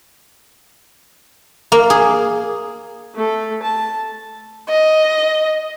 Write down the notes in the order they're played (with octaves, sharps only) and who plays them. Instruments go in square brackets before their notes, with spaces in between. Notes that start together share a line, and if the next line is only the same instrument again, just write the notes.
[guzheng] A#3
G#4
[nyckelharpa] A3 A4
A5
[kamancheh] D#5